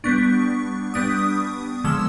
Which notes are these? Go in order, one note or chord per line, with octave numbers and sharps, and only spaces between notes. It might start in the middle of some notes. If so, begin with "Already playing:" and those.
G3 B3 D4 C#6
G3 B3 D4 D#6
D3 F3 G#3 E6